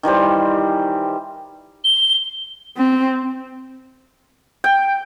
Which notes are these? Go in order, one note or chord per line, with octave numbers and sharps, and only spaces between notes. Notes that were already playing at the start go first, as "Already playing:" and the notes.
D#3 E3 G3 C5
G7
C4
G5